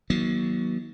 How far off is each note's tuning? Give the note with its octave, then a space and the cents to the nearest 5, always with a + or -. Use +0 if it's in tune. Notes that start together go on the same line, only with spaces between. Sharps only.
D#3 +40 F#3 +10 A#3 +45